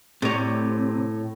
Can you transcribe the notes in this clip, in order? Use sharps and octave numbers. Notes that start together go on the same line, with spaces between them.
A2 C3 C#5